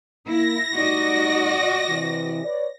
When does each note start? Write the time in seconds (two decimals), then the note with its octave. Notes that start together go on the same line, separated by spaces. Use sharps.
0.26 A#3 E4 A#6
0.74 G3 A3 D#4 F#4 D5 D#5
1.87 C3 E3
2.45 B4 C#5 D5